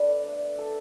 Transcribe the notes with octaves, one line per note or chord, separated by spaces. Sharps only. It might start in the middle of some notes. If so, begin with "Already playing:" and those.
Already playing: G3 B3 D4 A4 B4 D5
A3 D4
A4